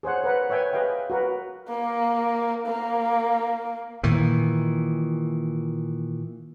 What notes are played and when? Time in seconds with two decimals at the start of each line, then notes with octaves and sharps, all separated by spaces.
0.03 G#4 C5 C#5 F#5
0.24 A#4 B4 F#5
0.49 B4 C#5 E5 G5 G#5
0.73 G#4 B4 D#5 F5 G5
1.10 F#4 A#4 B4
1.68 A#3
2.67 A#3
4.03 A#2 D#3 E3